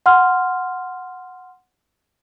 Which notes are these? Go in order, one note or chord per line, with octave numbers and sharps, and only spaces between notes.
F#5 C6 F6